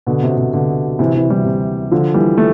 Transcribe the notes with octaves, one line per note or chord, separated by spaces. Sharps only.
B2 D3
C3
C3
B2 D3
C3 E3
C3 E3
E3 G3
C3
D3 F3
E3 G3
A3